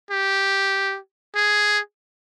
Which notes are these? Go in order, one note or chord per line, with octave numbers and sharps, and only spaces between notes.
G4
G#4